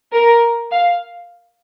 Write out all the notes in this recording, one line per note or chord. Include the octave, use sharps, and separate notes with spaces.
A#4
F5